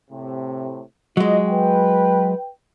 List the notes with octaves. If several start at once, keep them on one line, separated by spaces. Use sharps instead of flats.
A2 C3
F#3 G#3 F4 D#5
B4 G5